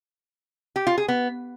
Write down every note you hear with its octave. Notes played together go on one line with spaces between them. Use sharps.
G4
F4
G#4
B3